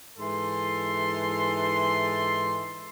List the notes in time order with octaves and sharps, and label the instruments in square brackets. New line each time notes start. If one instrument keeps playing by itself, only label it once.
[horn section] G#2 E3 A4 C6